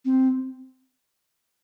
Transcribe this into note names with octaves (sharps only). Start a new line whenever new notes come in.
C4